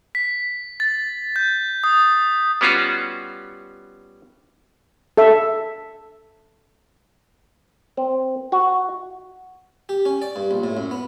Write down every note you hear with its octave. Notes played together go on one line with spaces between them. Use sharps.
B6
A6
G6
D#6
G3 B3 C#4 F4 F#4
A4 E5
C4
F#4
G4
C#4
D5
G2
A#1
A2
F#2
B3